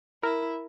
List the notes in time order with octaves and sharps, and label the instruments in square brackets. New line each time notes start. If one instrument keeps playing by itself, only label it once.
[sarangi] E4 [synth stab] A#4